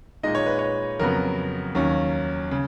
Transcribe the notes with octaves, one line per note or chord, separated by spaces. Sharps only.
A#2 G#3 D#4 D#5
C#5
B4
C#5
F2 C#3 F#3 B3 A#4
D#2 D#3 F#3 C#4
C#3